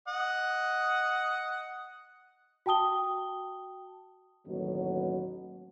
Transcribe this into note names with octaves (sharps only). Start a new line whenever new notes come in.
D#5 F#5
F#4 G5 A5 D#6 G7
A1 D#2 B2 F#3